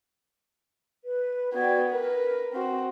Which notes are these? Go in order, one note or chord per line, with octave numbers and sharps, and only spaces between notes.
B4
B3 F#4 D5 G5 G#6
A#4 B4
C4 F#4